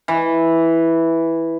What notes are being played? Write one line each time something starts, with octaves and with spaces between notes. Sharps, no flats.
E3